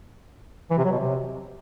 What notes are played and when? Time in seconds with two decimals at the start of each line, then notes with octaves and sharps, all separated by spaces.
0.70 E3
0.77 C3
0.85 F#3
0.92 B2
0.99 C3